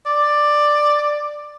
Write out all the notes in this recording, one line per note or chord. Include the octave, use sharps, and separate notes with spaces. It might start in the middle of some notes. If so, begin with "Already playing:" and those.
D5